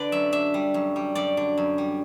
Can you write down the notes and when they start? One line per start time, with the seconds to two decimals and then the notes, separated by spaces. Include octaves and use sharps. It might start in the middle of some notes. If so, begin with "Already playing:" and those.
Already playing: D3 B4 D5
0.12 F#2 E5
0.32 D4 E5
0.54 G3
0.74 F#2
0.96 G3
1.15 F#2 D5
1.37 D3
1.58 F#2
1.78 G3